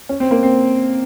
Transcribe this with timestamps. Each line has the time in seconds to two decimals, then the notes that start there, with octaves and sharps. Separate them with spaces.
0.09 C#4
0.20 C4
0.31 A#3
0.43 C4